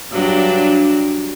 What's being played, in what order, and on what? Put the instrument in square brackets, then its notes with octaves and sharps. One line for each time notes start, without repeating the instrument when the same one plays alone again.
[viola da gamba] G2 F#3 D4